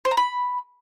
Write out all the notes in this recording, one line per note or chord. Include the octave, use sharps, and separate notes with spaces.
C5
A#5
B5